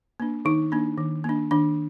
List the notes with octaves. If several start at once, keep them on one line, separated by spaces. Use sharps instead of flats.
A#3 D4
D#3 D#4
A#3 D4
D#3
A#3 D4
D#3 D4